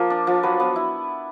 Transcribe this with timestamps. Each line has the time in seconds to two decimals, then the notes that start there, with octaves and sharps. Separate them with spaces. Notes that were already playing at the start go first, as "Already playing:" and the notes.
Already playing: F3 A#3
0.10 D4
0.27 F3
0.43 F#3 B4
0.60 B3
0.76 E4